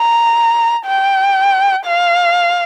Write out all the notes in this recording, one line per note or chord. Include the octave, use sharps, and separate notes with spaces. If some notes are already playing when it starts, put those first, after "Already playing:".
Already playing: A#5
G5
F5